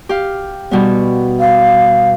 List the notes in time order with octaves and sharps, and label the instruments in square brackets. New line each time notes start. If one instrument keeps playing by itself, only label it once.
[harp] G4 F5
B2 G3 B3
[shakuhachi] F5